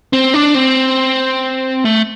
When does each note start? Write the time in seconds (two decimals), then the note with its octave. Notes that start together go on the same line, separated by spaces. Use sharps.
0.13 C4
0.34 D4
0.55 C4
1.85 A3